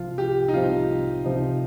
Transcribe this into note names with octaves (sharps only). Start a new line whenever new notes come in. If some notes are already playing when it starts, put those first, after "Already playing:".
Already playing: C2 C3 F3 F4
G4
D#4
C2 C3 F3 F4
C#2 C3 F3 C4 D#4